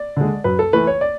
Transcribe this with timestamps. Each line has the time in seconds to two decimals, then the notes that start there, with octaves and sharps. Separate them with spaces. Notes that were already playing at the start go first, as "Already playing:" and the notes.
Already playing: D5
0.17 D3 G#3
0.44 F#2 B4
0.59 A4
0.73 E3 A3 B4
0.87 C#5
1.01 D5